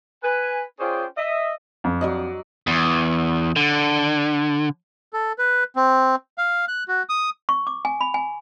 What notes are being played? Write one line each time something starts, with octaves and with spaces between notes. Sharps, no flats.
B4 G#5
C#4 F4 G#4 C5 D5 G5
D#5 E5
F2
F#3 D5 D#5
E2
D3
A4
B4
C4
F5
F#6
F#4
D#6
C#6
D6
G#5
B5
G#5